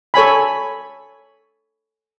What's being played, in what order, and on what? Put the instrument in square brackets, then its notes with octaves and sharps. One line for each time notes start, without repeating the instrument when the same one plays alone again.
[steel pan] A4 C#5 G#5 B5